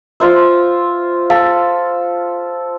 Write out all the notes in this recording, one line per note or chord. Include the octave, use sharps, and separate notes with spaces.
F4 C5 E5
A4 F5